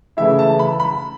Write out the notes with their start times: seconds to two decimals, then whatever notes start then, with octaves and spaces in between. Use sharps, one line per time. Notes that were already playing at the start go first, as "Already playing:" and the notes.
0.17 C#3 E3 A3 E4 E5
0.39 A5
0.59 B5
0.80 B5